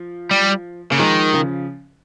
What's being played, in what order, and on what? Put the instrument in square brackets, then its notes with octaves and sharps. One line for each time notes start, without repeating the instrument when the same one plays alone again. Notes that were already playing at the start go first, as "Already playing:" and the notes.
Already playing: [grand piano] F3
[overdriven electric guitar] G3
[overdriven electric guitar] C#3 [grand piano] A#3
[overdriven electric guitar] D#3 [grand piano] F3 G#3
[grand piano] C#3 F3